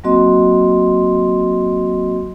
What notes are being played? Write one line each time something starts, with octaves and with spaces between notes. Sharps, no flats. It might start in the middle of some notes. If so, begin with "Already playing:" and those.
F#3 A#3 C4 F#4 D#5 C6